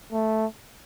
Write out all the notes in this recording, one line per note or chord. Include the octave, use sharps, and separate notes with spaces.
A3